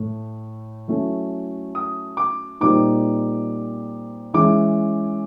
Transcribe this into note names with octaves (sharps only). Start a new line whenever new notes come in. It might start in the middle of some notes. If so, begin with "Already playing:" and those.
Already playing: A2 A3
F#3 A3 C#4 E4
D#6
D6
A#2 G3 C4 D#4 D6
E3 G#3 C#4 E4 D6